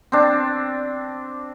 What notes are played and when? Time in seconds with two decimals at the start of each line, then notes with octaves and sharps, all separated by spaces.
0.12 C4 D4